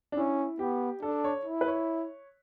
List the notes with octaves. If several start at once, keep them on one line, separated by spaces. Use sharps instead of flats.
D4
C#4 E4
B3 G4
D4 A4
C#5
E4
B4
C#5